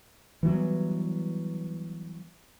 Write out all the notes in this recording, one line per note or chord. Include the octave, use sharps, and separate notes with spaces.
E3 F#3 G3 B3